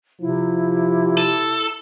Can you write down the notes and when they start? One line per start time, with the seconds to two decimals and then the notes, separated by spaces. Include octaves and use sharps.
0.21 C3 F3 E4
1.17 A4